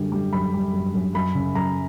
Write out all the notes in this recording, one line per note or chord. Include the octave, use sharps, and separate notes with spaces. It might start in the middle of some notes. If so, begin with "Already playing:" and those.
Already playing: F#2 D3 G3
G3
F#2 B5
G3
F#2
F#2
F#2 B5
C#3
F#2 A#5